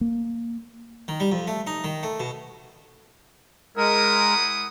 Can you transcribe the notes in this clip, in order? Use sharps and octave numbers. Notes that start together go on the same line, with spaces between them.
A#3
D#3
G3
F2
A3
D#4
D#3
A3
B2
G#3 E4 A#4 F#5 D#6